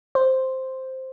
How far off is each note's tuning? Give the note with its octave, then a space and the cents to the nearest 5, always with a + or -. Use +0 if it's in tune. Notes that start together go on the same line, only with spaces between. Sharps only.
C5 +0